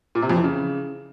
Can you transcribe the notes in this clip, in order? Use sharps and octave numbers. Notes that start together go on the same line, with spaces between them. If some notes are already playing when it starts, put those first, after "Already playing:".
A#2
C3
F2
E3
C#3